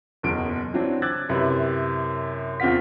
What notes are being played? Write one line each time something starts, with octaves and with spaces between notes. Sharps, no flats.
F#1 B1 E2 D7
E3 F#3 C4 D4
D6 E6 F#6 G#6 A6
F#2 C3 E4 B4
E2 C4 F4 F5 B6